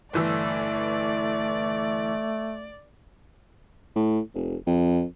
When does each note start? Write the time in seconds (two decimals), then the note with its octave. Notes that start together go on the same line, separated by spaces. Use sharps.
0.13 G1 E3 A3 D5 E6
3.96 A2
4.34 F1
4.67 F2